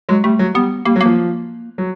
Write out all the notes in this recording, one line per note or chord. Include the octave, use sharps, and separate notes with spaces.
F#3 G#3
G3 A3
F#3
G3 B3
G3 A#3
F#3
F3 A#3
F#3